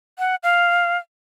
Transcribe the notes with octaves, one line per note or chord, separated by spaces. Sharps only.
F#5
F5